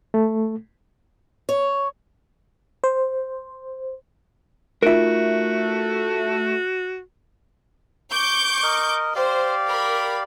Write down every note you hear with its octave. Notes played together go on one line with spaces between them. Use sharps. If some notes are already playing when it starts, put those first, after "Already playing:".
A3
C#5
C5
A3 D#4 F4 F#4 A#4 E5
C#6 D6 G6
A#4 D#5
G4 C5 D5 F5
A#4 B5